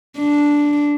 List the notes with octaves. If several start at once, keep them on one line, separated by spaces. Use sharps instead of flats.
D4